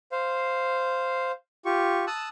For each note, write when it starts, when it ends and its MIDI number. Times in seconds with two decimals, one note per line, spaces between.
0.12 1.32 72
0.12 1.32 77
1.65 2.05 65
1.65 2.05 67
1.65 2.05 85
2.07 2.29 81
2.07 2.29 87
2.07 2.29 88
2.07 2.29 90